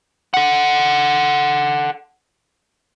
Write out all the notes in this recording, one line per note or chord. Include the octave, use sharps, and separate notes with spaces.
A4 F#5